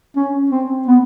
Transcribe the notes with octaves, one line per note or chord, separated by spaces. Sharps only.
C#4
C4
B3